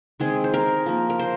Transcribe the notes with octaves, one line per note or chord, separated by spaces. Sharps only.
D#3 G#3 C4 G#4
C5
A#4
F3 A#3
A#4
C5